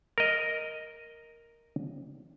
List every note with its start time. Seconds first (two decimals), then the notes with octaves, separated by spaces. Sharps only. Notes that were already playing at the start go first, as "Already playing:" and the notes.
0.18 A#4 D#5